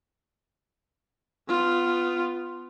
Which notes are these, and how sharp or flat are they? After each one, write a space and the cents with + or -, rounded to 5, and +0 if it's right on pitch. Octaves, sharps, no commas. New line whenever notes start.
B3 +20 F4 +0